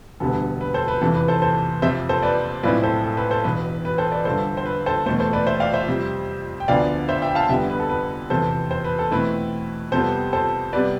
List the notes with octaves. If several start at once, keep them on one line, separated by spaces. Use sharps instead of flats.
E1 D2 D3 G3 B3 A4
B4
A4 C5
B4
F1 E2 C3 E3 A4
B4
A4 C5
A4 C5
F2 C3 F3 C5 E5
A4 C5
B4 D5
B1 A2 F3 C4 E4 B4 D5
A4 C5
A4
B4
A4 C5
E1 E2 B2 B4
B4
A4 C5
B4 D5
G1 G2 D3 A4 C5
C5
B4
A4 C5
E2 B2 A3 A4 C5
A4 C5
B4 D5
C5 E5
D5 F5
C5 E5
F2 C3 G3
G5
D2 D3 F3 B3 D5 F5
C5 E5
E5 G5
F5 A5
F2 D3 G3 B3 E5 G5
B4
A4
B4
F1 E2 C3 A4 C5
C5
B4
A4
E2 B2 A3 C4 E4 B4
F2 C3 G3 B3 A4 C5
A4 C5
C3 G3 B3 B4 D5